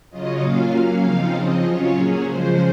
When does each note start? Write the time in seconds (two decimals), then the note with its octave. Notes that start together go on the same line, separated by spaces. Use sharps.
0.11 C#3 F#3 C#4 F4 D#5
0.41 A#2 F#3 A#3 C#4 F4 F5
0.71 F#3 A#3 C#4
1.02 C#3 F3 C4 D#4 F5
1.32 C#3 F3 C4 D#5
1.63 F#3 C#4 F4 C#5
1.93 A#2 F#3 C#4 G#4
2.24 C#3 F3 G#3 C5